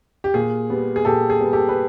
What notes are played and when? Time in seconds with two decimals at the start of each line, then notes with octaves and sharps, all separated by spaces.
0.24 G4
0.34 A#2 G#4
0.70 G3 B3
0.96 G#4
1.05 A#2 G4 A4
1.30 G#4
1.41 G3 B3
1.53 G4 A4
1.69 B4